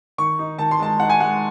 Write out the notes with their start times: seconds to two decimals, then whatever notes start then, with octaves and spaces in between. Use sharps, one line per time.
0.18 D#3 C#6
0.39 D#4
0.59 D#3 A5
0.71 C6
0.80 G#3 A5
1.00 D#4 F#5
1.09 G#5
1.20 G#3 F#5